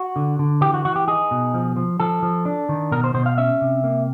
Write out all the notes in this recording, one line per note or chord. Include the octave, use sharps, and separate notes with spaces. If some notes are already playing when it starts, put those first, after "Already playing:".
Already playing: F#4
D3
D3
E3 G4
F#4
E3 F#4
G4
D#4 G#4
B2
F3
F3
F3 A4
F3
D4
D#3
B2 A#4
C5
B2 C5
F5
C#4 E5
C3
A#3